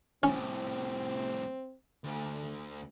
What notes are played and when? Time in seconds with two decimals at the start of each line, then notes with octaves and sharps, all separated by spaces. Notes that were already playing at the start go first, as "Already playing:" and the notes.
0.23 C2 A2 C4 C#4
2.04 D2 A3